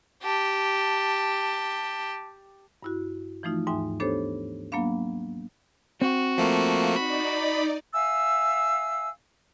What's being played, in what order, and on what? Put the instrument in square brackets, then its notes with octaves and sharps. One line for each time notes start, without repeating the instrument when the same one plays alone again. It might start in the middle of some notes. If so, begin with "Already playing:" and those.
[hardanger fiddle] G4 A5
[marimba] G2 E4 F#4
E3 F3 A3 D#4 F4
D#2 G#2 D#4 E5 G#5
B3 D4 G4 A4 C5 C#5
F#3 A#3 B3 D4 F5
[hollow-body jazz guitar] C4 [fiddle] F#4
[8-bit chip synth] F3 A3 A#3
[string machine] D#4 D5 [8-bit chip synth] B5
[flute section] E5 F5 G#5 E6